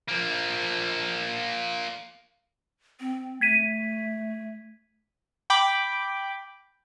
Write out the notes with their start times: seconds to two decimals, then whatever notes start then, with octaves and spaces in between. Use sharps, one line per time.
0.09 F3 A#3
3.00 C4
3.41 A3 G#6 B6 D#7
5.50 G5 B5 D6